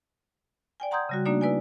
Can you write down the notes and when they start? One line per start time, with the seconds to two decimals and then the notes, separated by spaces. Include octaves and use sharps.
0.80 D5 G5 G#5
0.91 F#5 A#5 C6 D#6 G6 G#6
1.09 C#3 G3 F#4
1.26 A3 A#3 D4 D#4 F#4 D5
1.41 E4 B4 D5 G#5